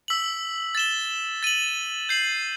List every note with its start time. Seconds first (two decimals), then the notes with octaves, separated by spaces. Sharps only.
0.08 E6 B6 F#7
0.75 A6 E7 G7
1.43 A6 D#7 F#7
2.09 G6 C7 F#7